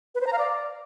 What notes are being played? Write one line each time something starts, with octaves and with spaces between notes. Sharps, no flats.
B4
C5
A#5
F5
D5